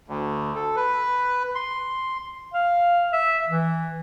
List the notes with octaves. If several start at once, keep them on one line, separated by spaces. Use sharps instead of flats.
D2
A4
B4
C6
F5
E5
E3